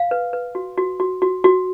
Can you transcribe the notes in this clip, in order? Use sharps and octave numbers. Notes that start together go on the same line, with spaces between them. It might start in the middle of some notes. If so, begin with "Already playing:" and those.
Already playing: F5
B4
B4
F#4
F#4
F#4
F#4
F#4